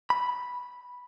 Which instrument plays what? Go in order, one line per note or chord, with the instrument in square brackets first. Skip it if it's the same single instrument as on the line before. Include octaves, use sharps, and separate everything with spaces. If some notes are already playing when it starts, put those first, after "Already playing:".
[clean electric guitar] B5